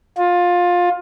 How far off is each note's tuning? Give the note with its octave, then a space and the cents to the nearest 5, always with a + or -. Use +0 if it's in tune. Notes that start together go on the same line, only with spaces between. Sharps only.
F4 +20